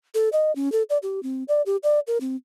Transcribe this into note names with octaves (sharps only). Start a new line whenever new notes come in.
A4
D#5
C#4
A4
D5
G4
C4
D5
G4
D5
A#4
C4